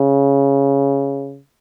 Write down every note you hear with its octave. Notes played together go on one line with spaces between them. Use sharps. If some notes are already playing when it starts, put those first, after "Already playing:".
Already playing: C#3